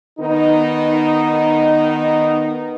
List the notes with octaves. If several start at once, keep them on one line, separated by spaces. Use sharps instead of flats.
D#3 B3 D#4